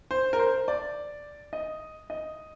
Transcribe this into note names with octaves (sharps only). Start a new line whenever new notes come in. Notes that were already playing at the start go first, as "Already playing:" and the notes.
C5
A#4
C5
D5
D#5
D#5